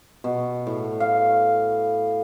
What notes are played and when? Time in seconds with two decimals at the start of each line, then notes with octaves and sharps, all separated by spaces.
0.24 B2
0.67 A2
1.00 F5